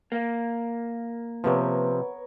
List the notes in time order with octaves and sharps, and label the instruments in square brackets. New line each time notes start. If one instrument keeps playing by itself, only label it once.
[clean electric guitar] A#3
[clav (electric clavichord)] C3 F3 [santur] B3 A#4 C#5